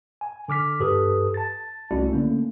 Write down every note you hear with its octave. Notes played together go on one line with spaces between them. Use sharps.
G#5
D3 D6 F6 B6
G2 G4 A4 B4 D#6
A5 A6
C2 A3 C#4 E4 F#4 D5
D3 A3 A#3 C#4